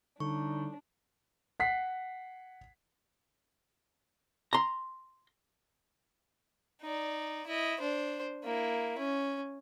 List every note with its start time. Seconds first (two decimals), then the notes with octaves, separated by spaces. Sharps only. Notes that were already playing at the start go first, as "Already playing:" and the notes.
0.20 A2 D3 G3 D4 D#4 C#6
1.60 F#5 B6 C7
4.53 A#5 C6
6.82 D#4 D5
7.46 E4 D#5
7.80 D4 C5
8.44 A#3 E4
8.98 C#4